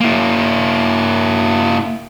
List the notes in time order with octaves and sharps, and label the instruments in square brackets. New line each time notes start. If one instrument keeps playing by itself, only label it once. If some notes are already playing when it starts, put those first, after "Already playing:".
[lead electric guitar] A#3 E4